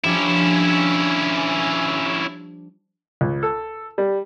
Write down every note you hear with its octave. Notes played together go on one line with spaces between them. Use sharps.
F3 G3 C#4 D4 E4
C#2
A4
G3